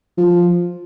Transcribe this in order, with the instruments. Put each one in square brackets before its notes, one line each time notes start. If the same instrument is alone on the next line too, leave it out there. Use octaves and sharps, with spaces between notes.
[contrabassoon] F3